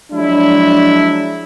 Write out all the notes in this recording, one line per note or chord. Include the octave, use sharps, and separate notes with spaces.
F3 F#3 G#3 D4 E4